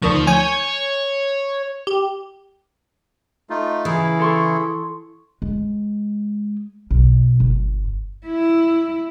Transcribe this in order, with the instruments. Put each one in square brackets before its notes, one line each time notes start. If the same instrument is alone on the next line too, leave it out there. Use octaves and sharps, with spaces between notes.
[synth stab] D2 D#3 C#6 [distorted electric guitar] F3
[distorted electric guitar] C#5 [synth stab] G#5 G6
[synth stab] G4
[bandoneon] A3 D#4 F4
[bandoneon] C#3 E4 G#4 [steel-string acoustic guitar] E3
[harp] A4 C6 C#6
[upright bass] G#3
B1
G1
[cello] E4